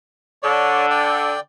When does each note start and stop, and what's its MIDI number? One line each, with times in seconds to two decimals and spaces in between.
0.43 1.34 50
0.43 0.86 73
0.43 0.86 74
0.90 1.40 74
0.90 1.40 79